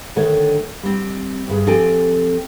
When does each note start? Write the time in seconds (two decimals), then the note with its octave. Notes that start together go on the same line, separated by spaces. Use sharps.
0.16 D3 D#3 A3 A4 C#5
0.83 G3 C4
1.48 D2 G2 G#4
1.67 F3 C4 G4 A4 G5 G#5